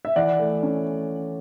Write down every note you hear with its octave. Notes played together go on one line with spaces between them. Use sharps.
E5
E3 D5 F#5
A3
C#4